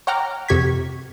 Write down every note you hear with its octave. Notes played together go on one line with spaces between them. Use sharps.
C#5 F#5 G5 A#5 D6 F6
F2 C3 G4 C#6 G#6 B6